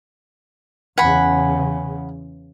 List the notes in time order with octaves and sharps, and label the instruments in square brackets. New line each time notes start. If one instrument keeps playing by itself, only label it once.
[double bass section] E2 C#3 [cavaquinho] F#5 G#5 B5